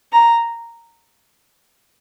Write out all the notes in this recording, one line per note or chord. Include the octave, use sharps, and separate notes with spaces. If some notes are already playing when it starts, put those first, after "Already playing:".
A#5